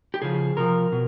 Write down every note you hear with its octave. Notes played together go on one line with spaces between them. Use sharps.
G4
C#3 F3 G#4
C3 F3 A#4
B2